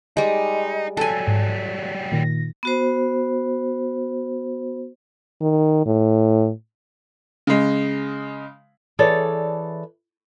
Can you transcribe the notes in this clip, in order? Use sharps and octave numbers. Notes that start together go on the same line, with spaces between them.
G3 G#3 D#4
F#3 G3 A4 G#5
G#2
B6
A#2 D#3 A#6
B3 F#4 C5
D#3
A2
C#3 G#3
E3 G#4 A4 C#5 D5